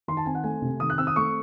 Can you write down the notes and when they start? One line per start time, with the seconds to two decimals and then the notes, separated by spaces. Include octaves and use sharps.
0.08 D#3 C6
0.17 A5
0.26 C4 G#5
0.35 F#5
0.44 A3 G#5
0.62 C3
0.80 D#3 D#6
0.90 F#6
0.98 C4 E6
1.07 D#6
1.16 A3 C#6